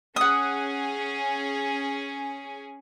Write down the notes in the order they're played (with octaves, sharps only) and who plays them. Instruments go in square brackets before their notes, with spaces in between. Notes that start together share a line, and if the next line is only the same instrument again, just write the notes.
[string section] C#4 G#4 [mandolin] F#5 D#6